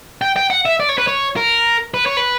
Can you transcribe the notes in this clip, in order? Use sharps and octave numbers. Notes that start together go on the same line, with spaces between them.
G5
G5
F#5
E5
D5
C#5
B4
C#5
A#4
B4
C#5
B4